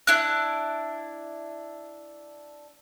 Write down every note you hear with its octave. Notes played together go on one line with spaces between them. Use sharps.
D4 E4 F#6